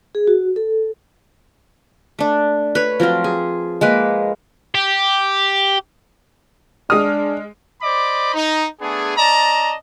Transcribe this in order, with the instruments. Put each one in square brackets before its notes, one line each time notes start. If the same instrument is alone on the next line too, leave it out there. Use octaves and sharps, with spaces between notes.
[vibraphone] G#4
F#4
A4
[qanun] A3 D4
B4 C#5
F3 F#3 C4 F4
G#4
G#3 A#3 B4
[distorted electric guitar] G4
[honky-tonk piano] G#3 F6 [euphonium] D4 [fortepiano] D#6
[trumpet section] C5 D5 D#5 B5 D6
D#4
A3 B3 D4 G#4
C#4 D5 D#5 A5 A#5